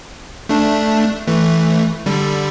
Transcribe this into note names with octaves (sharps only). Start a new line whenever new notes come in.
A3 D4
E3 A3
D3 G3